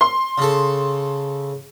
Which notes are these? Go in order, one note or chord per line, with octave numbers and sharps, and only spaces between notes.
C6
C#3 A4